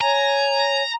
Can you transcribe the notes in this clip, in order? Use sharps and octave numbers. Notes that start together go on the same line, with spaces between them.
C#5 G#5 A#5